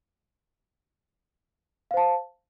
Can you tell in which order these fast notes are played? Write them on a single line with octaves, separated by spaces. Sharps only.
F5 C5 A5